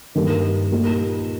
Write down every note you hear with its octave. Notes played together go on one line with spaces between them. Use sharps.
G2 D#3 G3 A#3 G4
A#2 A#3 D#4 G4